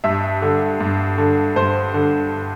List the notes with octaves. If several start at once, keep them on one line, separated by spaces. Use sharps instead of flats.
G2 E5
D3
G2
D3
G2 C5
D3